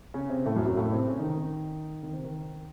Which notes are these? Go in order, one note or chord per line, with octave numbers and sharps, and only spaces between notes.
C#3 C#4
C3 C4
A2 A3
F#2 F#3
F#2 F#3
A2 A3
C3 C4
C#3 C#4
D#3 D#4
D#3 D#4
D#3 D#4
C3 C4
D#3 D#4